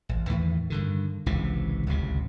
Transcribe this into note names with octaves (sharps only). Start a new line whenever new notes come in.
A1
E2 A2 D#3 E3
G2 D3 D#3
G#1 C#2 C3 E3
D1 G#1 C#2 C3